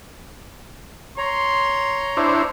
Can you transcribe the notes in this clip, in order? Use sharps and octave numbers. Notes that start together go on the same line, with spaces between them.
C#5 A#5 C6
D4 E4 C5